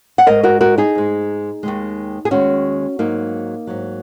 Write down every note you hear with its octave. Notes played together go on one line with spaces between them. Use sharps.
F#5
G#2 G#3 A#4 D#5
F#4 A#4
F#4 A#4
D#4 G#4
G#2 G#3
D#2 D#3 G#3
G#4
D#2 D#3 G#3 C#4 F#4
G#2 F#3 A#3 D#4
G#2 F#3